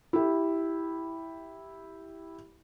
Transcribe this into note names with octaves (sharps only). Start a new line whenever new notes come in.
E4 G4